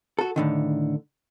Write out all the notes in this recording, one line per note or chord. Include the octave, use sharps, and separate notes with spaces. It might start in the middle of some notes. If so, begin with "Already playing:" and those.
F#4 A4
A2 D3 D#3